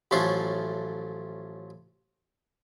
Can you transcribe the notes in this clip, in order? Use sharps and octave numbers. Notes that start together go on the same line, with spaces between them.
A1 F3 F#3 A3 C#4 C6